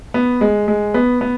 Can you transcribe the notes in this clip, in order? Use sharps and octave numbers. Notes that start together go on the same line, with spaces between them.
B3
G#3
G#3
B3
B3